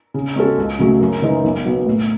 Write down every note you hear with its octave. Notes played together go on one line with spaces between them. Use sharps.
C#3
G#3 C#4 F#4 A4
C#2
C#3 F#3 A3
F#2
C#3 E3 G#3 D#4
B1
B2 F#3 B3
A2